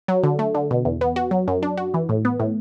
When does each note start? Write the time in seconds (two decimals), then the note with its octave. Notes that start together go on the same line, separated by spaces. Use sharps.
0.08 F#3
0.23 D3
0.39 A3
0.55 D3
0.71 B2
0.85 E2
1.01 B3
1.16 F#4
1.31 F#3
1.48 F#2
1.63 D4
1.77 F#4
1.94 E3
2.09 A2
2.25 B3
2.40 A2